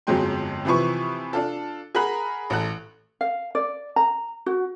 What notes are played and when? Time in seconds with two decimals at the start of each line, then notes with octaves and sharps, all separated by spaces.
0.07 G1 F2 F#3 G#3 G5 C6
0.65 C3 E3 F3 B4 C#6
1.33 D4 F4 A4
1.95 G#4 A#4 F#5 A#5 B5 F#6
2.50 A1 A4 F#6
3.21 F5
3.55 D5
3.96 A#5
4.46 F#4